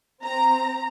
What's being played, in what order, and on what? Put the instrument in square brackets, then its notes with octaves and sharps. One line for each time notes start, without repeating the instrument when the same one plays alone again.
[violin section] C4 A#5